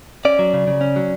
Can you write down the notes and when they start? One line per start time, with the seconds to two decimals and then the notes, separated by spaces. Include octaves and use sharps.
0.25 C#4 D5
0.39 F#3
0.54 C#3
0.67 C#3
0.81 C#4
0.96 F#3